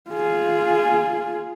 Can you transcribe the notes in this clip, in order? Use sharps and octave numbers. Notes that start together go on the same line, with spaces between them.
F4 G#4